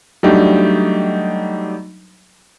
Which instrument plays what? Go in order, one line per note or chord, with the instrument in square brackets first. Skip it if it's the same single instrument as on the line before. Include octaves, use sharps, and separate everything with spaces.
[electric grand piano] F#3 G3 A3 D4 D#4 G4